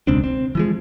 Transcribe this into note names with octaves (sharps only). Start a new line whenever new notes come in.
E1 C#2 C4 D4
C4
E3 F3 G#3